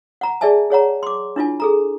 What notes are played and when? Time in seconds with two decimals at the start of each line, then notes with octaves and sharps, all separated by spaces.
0.21 F#5 A#5
0.41 G#4 D5 E5 G#5 A5
0.70 G#4 C#5 F#5 A#5
1.03 C6 D6
1.36 D4 E4 F4 G#5
1.60 G#4 A4 A#5